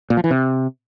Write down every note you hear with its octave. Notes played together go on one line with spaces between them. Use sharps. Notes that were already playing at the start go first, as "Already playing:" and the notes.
A#2
F3
E3
C3